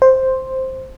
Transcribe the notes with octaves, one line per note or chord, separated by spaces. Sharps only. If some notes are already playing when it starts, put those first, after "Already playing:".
C5